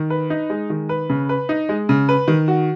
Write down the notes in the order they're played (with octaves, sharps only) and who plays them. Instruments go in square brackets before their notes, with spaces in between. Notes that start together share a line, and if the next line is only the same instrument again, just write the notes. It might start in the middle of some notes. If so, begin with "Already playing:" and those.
Already playing: [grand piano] D#3
B4
D#4
G#3
D#3
B4
C#3
B4
D#4
G#3
C#3
B4
D#3
F#4